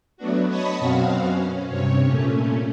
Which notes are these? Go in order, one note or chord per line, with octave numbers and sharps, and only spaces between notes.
F#3 A3 B3 D4 F#4
C#5 D#5 A5 B5 C#6 D#6
F#2 B2 C4 F#4 F5
C#4
G2 C3 C#5
A#2 A3 C#4